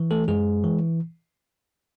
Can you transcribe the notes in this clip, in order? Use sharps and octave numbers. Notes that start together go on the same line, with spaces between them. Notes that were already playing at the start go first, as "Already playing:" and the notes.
Already playing: E3
A3 A4
F#2 G#3 G#4
E3